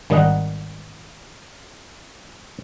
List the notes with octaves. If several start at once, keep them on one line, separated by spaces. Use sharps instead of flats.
G#1 D#3 G3 D#4 D#5 F#5